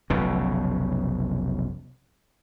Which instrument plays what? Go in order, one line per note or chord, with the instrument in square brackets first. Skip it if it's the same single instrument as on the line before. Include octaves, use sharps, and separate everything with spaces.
[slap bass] F1 B1 C#3